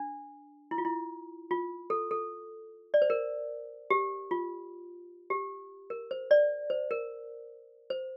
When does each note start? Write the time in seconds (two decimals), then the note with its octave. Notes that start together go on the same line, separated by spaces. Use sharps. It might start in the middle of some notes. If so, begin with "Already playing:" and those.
Already playing: D4
0.71 E4
0.78 F4
0.85 E4
1.51 F4
1.90 A4
2.11 A4
2.94 D5
3.02 C5
3.10 A#4
3.90 G4
4.31 F4
5.30 G4
5.90 A#4
6.11 C5
6.31 D5
6.70 C5
6.91 A#4
7.90 C5